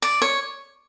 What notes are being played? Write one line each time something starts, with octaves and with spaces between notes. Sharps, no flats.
D5
C#5